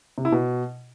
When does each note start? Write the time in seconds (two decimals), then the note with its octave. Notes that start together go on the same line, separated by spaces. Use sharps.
0.18 C3
0.25 E4
0.32 B2